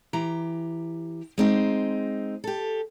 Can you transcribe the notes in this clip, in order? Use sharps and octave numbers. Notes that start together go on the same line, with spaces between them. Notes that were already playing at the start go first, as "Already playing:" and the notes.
E3 G4 A#5
G#3 C4 D#4
G4 A4